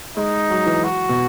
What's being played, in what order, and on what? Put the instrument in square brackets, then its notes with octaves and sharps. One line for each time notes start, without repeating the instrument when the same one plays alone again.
[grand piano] G#3 [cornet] D#4
[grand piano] F#3
E3
[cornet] F#4
[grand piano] B2